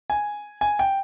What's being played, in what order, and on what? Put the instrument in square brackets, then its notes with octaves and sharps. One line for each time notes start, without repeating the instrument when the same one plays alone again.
[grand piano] G#5
G#5
G5